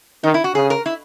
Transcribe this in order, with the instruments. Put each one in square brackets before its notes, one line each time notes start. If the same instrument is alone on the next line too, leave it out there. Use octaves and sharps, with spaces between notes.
[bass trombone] D#3 [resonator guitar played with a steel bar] D#4
[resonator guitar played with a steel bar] E4
F#4
[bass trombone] C#3 [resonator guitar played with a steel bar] G#4
[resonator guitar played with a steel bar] A#4
E4